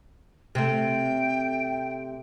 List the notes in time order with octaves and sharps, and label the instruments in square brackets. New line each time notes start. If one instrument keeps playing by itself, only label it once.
[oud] C3 A3 [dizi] G5